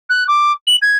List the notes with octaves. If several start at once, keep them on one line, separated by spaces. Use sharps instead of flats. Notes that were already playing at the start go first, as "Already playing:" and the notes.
F#6
D6
F#7
G#6